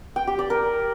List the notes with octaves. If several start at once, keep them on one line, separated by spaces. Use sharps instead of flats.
G5
G4
D5
A#4